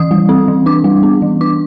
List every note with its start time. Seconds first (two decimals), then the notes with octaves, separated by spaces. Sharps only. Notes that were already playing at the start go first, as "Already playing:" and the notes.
Already playing: E3 D#6
0.11 G3
0.29 C4
0.48 E3
0.66 D4 D6
0.84 G3
1.03 B3
1.22 E3
1.41 D4 D6